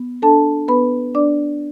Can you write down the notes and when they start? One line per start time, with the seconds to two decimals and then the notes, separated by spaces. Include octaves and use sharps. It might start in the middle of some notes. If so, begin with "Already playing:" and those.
Already playing: B3
0.22 D4 A4 A5
0.68 B3 B4 B5
1.15 D4 D5 D6